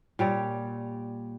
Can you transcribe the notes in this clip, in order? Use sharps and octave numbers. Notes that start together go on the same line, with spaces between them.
A#2 G3 C#5 D5